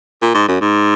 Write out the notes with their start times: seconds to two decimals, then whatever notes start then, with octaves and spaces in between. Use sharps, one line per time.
0.22 A#2
0.35 G#2
0.48 F#2
0.61 G#2